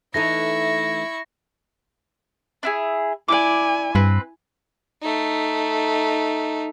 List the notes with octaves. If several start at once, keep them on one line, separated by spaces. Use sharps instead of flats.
E3 A3 D#4 E4 C#6 A#6
D4 E4 G#4
E4 D5 G#5 D6
G2 C4 B4
A3 D#4